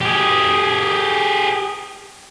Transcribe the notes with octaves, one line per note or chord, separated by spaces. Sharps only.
G4 G#4